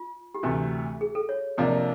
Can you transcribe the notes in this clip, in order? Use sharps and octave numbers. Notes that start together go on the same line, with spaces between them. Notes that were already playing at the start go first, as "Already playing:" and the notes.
Already playing: F4
G4
D2 C3 E3 A3 F#4
G#4
A4
C#5
F2 C3 F3 A#3 D4